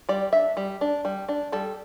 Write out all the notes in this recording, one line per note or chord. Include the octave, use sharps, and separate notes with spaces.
G3 D5
D4 E5
G3
D4
G3
D4
G3 A4